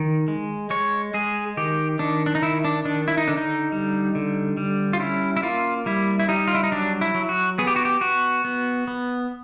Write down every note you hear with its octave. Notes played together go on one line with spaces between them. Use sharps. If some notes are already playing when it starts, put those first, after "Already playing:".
Already playing: D#3
G#3
G#3 C#5
G#3 G#4
D#3 G4
D#3 D4
D4
D#4
D#3 E4
D4
D#3 D4
E4
D#4
D3 D4
D#4
G3
D3
G3
F4
C#4 E4
E4
A#3 F4
G3 E4
E4
G3 D#4
F4
E4
D#4
F#3 D4
E4
F#3
F#4
B3 G#4
G4
F#4
G4
B3 F#4
B3
B3